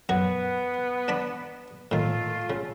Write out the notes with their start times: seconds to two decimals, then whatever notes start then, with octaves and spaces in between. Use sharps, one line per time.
0.09 F#2 B3 F#4 C#6
1.08 D4 D5 B5
1.91 A2 D#3 A3 F4
2.50 C#3